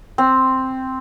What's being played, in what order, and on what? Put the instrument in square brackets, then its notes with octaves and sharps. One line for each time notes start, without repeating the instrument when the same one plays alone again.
[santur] C4